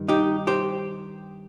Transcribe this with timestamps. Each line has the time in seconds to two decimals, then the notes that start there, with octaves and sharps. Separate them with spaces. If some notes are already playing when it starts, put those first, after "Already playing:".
Already playing: G2 D#3
0.08 D#4 G4
0.47 G4 C5